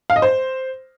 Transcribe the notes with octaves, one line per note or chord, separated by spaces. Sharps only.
F5
D#5
C5